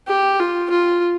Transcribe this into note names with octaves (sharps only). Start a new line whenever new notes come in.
G4
F4
F4